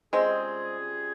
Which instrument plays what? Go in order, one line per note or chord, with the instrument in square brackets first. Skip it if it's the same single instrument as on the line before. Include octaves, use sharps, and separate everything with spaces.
[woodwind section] C3 G3 C#4 F4 G#4 [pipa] G#3 C4